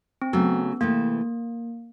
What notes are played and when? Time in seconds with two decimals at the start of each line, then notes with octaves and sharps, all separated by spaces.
0.22 C4
0.33 C#3 F#3 A3 B3
0.81 C3 E3 A3 A#3